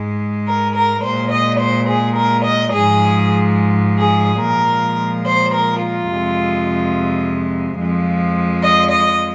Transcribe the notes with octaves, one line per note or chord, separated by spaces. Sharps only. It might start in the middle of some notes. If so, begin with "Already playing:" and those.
Already playing: G#2 G#3
A#4
A#4
A#2 G#3 C5
D#5
C5
G#4
A#4
D#5
G#2 F3 G#3 G#4
G#4
A#2 F3 G#3 A#4
C5
A#4
F4
F2 C3 G#3
F2 F3 G#3
D#5
D#5